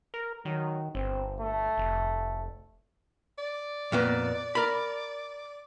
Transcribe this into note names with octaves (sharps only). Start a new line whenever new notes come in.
A#4
D#3 F#3
G1 C4
A3
F1
D5
F2 A#2 B3
A#4 B5